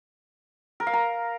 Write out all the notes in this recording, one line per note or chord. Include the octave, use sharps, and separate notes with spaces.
A#4
F5
A#5